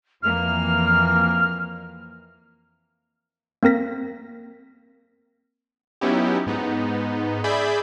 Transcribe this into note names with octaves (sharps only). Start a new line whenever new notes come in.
F2 E3 A#3 F6
A#3 C4 A#4 A#6 B6
F#3 B3 C#4 D#4 E4 G4
G#2 B3 D#4
G#4 D5 E5 B5 G6